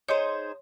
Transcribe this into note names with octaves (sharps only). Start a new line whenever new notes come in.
D#4 G#4 C5 C#5